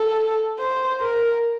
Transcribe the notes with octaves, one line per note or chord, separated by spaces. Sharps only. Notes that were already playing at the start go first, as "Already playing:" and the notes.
Already playing: A4
C5
A#4